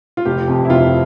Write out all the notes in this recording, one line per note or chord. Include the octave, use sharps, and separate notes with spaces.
F4
F1 G4
F2 C3
E4
F1 F4